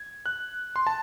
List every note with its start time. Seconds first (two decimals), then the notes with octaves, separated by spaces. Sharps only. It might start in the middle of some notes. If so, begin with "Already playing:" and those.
Already playing: G#6
0.26 F#6
0.76 C6
0.87 A5